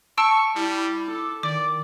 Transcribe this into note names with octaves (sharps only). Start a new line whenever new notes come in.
A5 C#6 E6 D7
G3 E4
A4 D6
D#3 D5 D6